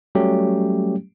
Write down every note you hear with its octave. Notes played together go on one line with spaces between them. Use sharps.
F#3 G3 A3 C#4 G4